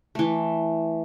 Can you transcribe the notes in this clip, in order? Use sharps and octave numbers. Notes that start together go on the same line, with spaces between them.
E3 A3